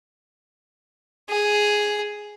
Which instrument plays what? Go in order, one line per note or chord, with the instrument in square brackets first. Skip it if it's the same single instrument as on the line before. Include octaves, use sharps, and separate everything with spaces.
[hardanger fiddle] G#4